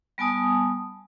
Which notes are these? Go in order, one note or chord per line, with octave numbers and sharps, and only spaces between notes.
G3 B3 G#5 A5 D#6